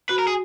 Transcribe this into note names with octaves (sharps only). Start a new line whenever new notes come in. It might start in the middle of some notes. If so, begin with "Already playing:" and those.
F#4 B4
A#4
G#4